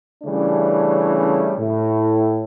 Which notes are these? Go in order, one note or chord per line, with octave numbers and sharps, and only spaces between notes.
C#3 E3 G3 A3 C#4 D4
A2